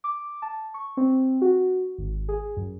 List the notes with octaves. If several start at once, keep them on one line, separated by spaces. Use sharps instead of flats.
D6
A5
C#6
C4
F#4
G#1
G#4
F#2